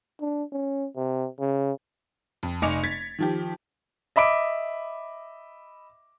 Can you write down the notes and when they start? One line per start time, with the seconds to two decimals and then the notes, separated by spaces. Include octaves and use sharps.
0.20 D4
0.52 C#4
0.96 C3
1.39 C#3
2.43 F2
2.62 F1 D#5 G#5 D6 C#7 F7
2.83 G#6 A6 B6
3.19 D#3 F3 G4
4.16 D#5 E5 B5 D6 D7